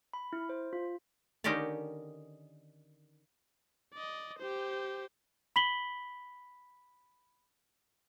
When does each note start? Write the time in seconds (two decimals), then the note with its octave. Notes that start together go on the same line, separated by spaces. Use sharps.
0.14 B5
0.33 E4
0.49 C5
0.73 F4
1.44 D3 D#3 C#4 D#4 G4 D5
3.93 D5 D#5
4.39 G4 C5
5.56 B5 B6 F#7 G7